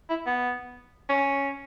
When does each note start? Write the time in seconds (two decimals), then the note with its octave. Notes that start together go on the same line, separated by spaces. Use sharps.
0.10 E4
0.26 B3
1.09 C#4